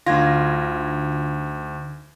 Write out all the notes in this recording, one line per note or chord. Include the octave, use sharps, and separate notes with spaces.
D2 D3 D#4 F4 G#6 A#6